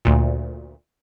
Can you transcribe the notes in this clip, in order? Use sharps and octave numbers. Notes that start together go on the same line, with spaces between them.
D2 A#2